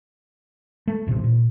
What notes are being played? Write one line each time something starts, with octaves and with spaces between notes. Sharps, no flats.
A3
E1 A1 C3
A#2